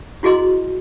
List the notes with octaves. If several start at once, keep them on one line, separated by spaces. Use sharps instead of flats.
E4 F#4 G#4 D#5 C6